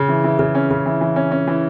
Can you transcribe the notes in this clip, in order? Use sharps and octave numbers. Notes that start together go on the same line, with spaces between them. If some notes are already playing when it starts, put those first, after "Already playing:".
Already playing: C#3
E3
E3
C#3
C#4
C#3
E3
E3
C#4
C#4
E3